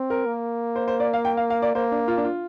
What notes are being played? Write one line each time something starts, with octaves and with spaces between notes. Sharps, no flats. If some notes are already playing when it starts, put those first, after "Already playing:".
Already playing: C4
A#4
A#3
C5
C5
D5
F5
G5
F5
F5
D5
A#3 C5
D4
F4
D4
F4